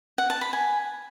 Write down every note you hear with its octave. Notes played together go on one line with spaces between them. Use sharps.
F#5
A5
B5
G#5